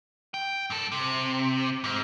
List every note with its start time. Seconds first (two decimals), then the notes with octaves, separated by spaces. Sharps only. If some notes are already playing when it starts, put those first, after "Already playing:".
0.34 G5
0.70 G2 A4
0.92 C3
1.84 G#2